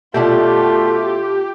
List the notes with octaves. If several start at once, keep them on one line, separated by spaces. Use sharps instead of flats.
B2 A3 D4 E4 F4 G4